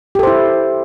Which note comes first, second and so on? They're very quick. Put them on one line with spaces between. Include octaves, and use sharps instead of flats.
G4 A4 C5 E4